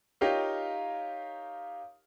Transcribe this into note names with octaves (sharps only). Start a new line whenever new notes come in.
D#4 F4 G4 A#4 C#5 F5